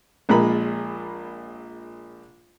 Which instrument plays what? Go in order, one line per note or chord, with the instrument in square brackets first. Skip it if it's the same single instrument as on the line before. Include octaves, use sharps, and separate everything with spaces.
[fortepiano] A#1 A#2 G#3 A#4 B5